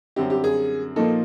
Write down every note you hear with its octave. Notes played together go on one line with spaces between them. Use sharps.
F#2 D3 G3 C4 G4
G4
G#4
A#2 F3 A#3 D#4 A4